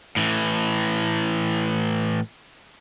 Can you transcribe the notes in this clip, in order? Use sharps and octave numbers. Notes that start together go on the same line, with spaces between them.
A2 E3